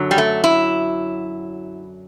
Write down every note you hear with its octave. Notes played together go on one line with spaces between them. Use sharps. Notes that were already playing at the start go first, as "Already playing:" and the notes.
Already playing: F#2 D3 F#3
G3
A3
E4